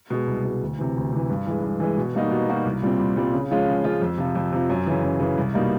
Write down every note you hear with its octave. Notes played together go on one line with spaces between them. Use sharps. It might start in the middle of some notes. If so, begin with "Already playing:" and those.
B2 G#3
C2
B2 G#3
D2
C3 E3
D2
C3 E3
G2
E3 G#3
G2
E3 G#3
B2
G3 A#3 D#4 F#4
B2
G3 A#3 D#4 F#4
C2
A#2 G3 C4
C2
A#2 G3 C4
C#3
F3 G#3 C#4 F4
C#3
F3 G#3 C#4 F4
F2
C3 F3
F2
C3 F3
F#2
C#3 E3
F#2
C#3 E3
C2
B2 G3 A#3 D#4